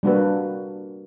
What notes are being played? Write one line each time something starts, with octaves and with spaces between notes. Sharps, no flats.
G3 A#3 D4 F#4 A#4 B4